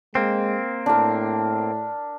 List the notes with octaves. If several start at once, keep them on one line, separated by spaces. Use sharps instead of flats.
G#3 A#3 C4
A2 D4 A#4